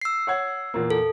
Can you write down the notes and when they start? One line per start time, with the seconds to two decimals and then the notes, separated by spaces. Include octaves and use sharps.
0.02 E6 C7
0.27 C#5 F#5 G#6
0.74 E2 A#2 A#3
0.90 A4